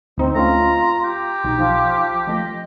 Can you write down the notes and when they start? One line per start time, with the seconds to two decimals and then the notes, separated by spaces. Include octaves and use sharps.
0.18 D2 C4 D#4
0.35 A3 C4 C#4 F4 A#5
1.04 G4
1.44 B1 D#4
1.57 F3
2.27 F3 A3 D#5